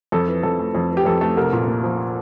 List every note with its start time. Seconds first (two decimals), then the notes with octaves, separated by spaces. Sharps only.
0.12 F2 A4
0.28 E3
0.43 F2 A4
0.59 A3
0.75 F2
0.90 E3
0.97 G4
1.05 F2 A4
1.21 A3 A4
1.37 C2 A#4
1.53 A#2
1.68 A#3
1.84 F3